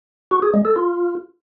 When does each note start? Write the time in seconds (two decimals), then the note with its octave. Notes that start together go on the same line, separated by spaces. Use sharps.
0.31 F#4
0.42 G#4
0.54 G#3
0.65 A4
0.76 F4